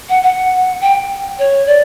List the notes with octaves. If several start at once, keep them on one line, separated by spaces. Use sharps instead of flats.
F#5
F#5
G5
C#5
D5